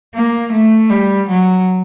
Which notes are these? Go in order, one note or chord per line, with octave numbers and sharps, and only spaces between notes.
A#3
A3
G3
F#3